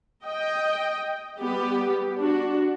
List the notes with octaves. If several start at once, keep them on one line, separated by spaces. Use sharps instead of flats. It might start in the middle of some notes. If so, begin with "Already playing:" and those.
D#5 G5
G3 B3 G4
D4 F#4